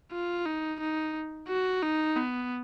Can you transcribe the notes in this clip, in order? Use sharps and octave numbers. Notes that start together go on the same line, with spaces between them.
F4
D#4
D#4
F#4
D#4
B3